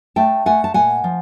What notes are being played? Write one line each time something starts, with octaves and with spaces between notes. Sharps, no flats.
A3 G5 A5
A3 F#5 G#5
A5
A#2 F#5 G#5
F3